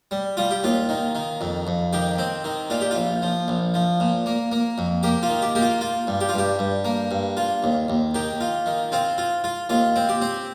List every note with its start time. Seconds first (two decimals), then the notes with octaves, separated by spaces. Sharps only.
0.11 G3
0.37 G3 F4
0.51 G4
0.63 D#2 F4
0.89 D#3
1.15 D#3
1.41 F2
1.67 F2
1.93 D#3 G4
2.18 C4
2.44 D#3
2.70 A#2 F4
2.81 G4
2.91 A#1 F4
3.22 F3
3.48 A#1
3.74 F3
4.00 A#2
4.26 A#3
4.52 A#3
4.78 F2
5.03 A#3 G4
5.23 F4
5.29 D#3
5.42 G4
5.55 A#3 G4
5.62 F4
5.81 F4
6.07 G2
6.21 G4
6.29 F4
6.34 G2 G4
6.59 G2
6.85 A#3
7.11 G2
7.37 F4
7.63 D#2
7.88 D#2
8.14 D#3 G4
8.41 F4
8.66 D#3
8.92 C4 F4
9.18 F4
9.44 F4
9.69 D#2 F4
9.96 C4
10.09 G4
10.21 C4